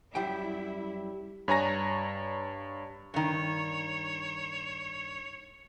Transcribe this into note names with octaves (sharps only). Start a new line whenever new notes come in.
F#2 G3 E4 G5
G2 C#5 G#5 A#5 A#6
G2 D#3 C#5